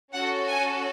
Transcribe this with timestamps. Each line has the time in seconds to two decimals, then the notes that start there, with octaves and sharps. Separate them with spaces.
0.14 C#4 F#4 A4 F#5
0.48 G#5